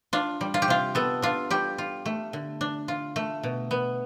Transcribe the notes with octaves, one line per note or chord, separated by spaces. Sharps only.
D4 F4
G3
F4
G4
C3 F4
B3 A4
D4 F4
G3 G4
F4
A3
D3
D4
F4
A3
B2
B3